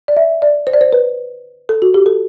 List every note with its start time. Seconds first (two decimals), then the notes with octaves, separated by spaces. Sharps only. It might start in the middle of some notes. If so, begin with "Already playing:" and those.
0.08 D5
0.17 E5
0.42 D5
0.67 C5
0.73 D5
0.81 C5
0.93 B4
1.69 A4
1.82 F#4
1.94 G4
2.06 A4